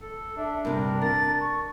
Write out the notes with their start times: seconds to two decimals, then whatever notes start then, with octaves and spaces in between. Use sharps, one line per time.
0.02 A4
0.37 D4 E5
0.65 G2 C3 A#4
1.01 A#4 A6
1.41 C#6